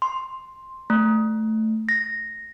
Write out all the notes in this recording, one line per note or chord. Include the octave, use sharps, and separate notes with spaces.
C6
A3
A#6